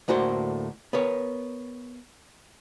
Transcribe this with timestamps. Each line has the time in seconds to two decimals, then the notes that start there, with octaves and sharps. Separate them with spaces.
0.08 D2 A2 A#3 F#4 C5
0.93 B3 A#4 C#5